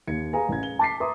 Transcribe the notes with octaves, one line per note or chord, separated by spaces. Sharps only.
D#2 G#6 C#7
G#4 B4 F5 G#5 A#5
A1 G#6
G7
A5 D6 A6 B6 C7
B4 E5 A#5 C6 D6 D#6